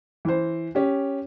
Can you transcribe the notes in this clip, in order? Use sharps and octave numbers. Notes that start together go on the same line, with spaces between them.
E3 C5
C#4 G4